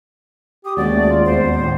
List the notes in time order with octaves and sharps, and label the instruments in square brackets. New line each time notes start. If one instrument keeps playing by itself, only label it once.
[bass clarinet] G4 [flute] D#6
[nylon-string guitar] D#2 G#3 C#4 [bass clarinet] F#4 [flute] D5
[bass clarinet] A3
F4
[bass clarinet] E2 [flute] C5
[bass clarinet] A2